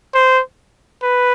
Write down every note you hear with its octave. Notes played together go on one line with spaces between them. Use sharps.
C5
B4